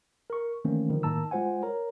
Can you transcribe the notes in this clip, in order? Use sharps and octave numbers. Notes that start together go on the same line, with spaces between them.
A#4 C#6
D#3 E3 A3 A#3 C4 C#4
D3 D#3 F3
A2 D#3 A#3 A5 A#5 E6
G#3 F4 C5 F#5 G#5
A#4 C#5 A#5